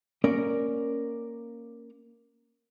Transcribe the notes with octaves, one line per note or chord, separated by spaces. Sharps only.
A#3 C#4 A#4 D5